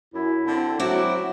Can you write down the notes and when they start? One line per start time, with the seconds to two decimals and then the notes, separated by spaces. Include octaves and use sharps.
0.14 F#2 E4
0.46 D3 C4
0.80 F#3 C4 E4 F#4 D6